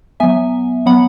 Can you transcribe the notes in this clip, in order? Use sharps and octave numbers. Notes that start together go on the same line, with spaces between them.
F#3 B3 E5 G#5
F#3 B3 F#5 B5